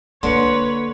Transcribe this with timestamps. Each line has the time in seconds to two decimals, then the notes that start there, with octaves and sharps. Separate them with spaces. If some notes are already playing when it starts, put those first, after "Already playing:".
0.23 D3 A#3 D4 B4 C#5 C6 C#7